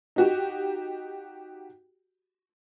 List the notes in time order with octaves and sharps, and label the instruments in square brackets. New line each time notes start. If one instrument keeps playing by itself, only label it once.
[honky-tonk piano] D#4 F#4 G4